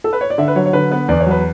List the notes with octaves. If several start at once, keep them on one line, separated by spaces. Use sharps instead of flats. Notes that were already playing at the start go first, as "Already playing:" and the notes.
A4
B4
C#5
D5
D3 E5
B4
F#3 C#5
C#5
D3 B4
B3 B4
E2 D5
C#5
F#3 B4